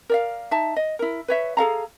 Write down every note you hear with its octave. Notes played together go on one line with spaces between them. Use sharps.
A#4 D5 F5
D#4 E5 A5
D#5
E4 A#4
B4 C#5 E5
G#4 A4 F5 A#5